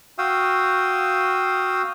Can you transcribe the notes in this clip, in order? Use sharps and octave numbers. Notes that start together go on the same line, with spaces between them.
F#4 F5 G5 D#6 E6